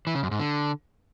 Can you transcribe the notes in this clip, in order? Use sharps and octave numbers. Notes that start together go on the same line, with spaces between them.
E3
C#3
F#2
G#2
D3